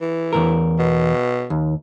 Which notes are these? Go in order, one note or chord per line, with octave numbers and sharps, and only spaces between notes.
E3
E2 G2 A#4
B2
D#2